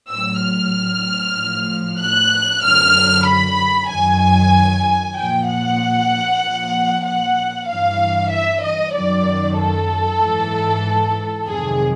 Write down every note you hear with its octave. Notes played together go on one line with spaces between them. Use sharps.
A2 F#3 E6
F6
A2 F3
F#6
F#2 D3 F#3 F6
B5
F#2 D#3 F#3 G#5
A#2 F3 G5
F#5
A#2 F3
F#5
G2 E3 F5
E5
D#5
F#2 D#3 F#3 D5
A4
G#2 E3
F2 C3 D#3 F#3 G#4